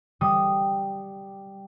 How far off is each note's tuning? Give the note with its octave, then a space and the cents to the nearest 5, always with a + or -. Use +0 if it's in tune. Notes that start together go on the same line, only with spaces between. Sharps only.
G3 +0 D#6 -5